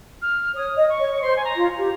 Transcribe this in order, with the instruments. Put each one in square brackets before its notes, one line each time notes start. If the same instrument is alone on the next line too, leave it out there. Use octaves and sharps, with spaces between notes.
[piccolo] F6
[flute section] C#5 [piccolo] D#6
[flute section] D#5
[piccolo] C#6
[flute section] C#5
[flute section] C5 [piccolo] C6
[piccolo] G#5
A#5
[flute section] F4
G4